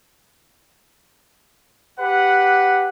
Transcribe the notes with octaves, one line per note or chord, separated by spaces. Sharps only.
G4 B4 F#5